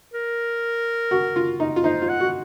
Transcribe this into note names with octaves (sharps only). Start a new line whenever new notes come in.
A#4
F#4
F4
D#4
F4
D#4 C5
F4
F#5
F#4